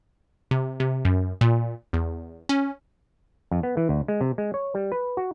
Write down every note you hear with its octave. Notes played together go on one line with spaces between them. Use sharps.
C3
C3
F#2
A#2
E2
C#4
F2
B3
E3
D2
G#3
C3
G#3
C#5
G3
B4
F#4